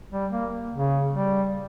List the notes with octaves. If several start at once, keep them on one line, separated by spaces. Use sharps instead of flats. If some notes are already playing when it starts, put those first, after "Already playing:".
G3
A#3
C#3
G3